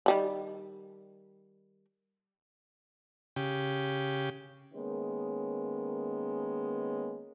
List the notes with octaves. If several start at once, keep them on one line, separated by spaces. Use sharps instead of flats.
D#3 G3 B5
C#3 G4
D#3 G#3 A#3 B3 C#4